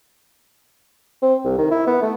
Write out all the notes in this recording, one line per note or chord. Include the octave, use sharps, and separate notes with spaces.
C4
C2
D#3
E4
B3
A3